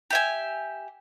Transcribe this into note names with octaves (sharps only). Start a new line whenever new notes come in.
G4 E5 G#5